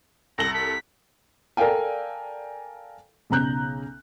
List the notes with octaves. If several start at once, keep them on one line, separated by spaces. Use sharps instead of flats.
C2 A4 A#6 F#7
B6
A4 A#4 D5 F5 G5 G#5
B1 C#3 A#5 F#6 G6